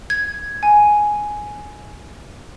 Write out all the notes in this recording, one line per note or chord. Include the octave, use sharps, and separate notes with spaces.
G#6
G#5